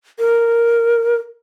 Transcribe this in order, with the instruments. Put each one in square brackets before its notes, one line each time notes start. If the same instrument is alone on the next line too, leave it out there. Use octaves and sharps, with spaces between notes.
[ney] A#4